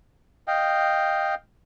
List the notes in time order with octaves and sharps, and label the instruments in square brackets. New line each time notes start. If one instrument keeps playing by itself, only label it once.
[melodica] D#5 F5 G5